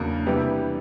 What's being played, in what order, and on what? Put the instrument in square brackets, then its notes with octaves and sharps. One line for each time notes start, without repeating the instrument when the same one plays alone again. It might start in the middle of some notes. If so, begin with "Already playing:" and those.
Already playing: [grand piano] E2 C#3 F#3 A#3 [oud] D4
[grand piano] C3 E3 G3 B3